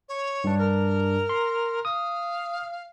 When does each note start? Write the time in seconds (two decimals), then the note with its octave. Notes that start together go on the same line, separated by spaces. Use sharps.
0.09 C#5
0.44 G2 D4
0.59 A#4
1.29 C6
1.85 F5 D#6